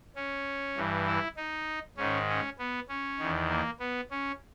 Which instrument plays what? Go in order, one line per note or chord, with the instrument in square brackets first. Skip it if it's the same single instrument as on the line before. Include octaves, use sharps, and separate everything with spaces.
[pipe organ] C#4
G2 E3
E4
D#4
G#2 D#3 C#4
C#4
B3
C#4
E2 D#3
A#3
B3
C#4